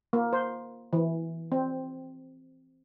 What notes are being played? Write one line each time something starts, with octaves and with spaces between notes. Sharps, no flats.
A#3
C5
E3
C4